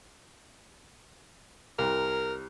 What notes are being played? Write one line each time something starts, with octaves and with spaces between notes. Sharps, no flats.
C2 A#4